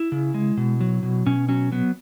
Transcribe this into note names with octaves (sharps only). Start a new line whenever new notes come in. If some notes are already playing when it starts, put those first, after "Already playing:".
Already playing: E4
C#3
G#3
B2
F#3
B2
B2 C#4
F#3 C#4
F#3 B3